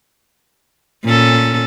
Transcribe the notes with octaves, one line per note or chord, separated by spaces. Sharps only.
A#2 C#4 A4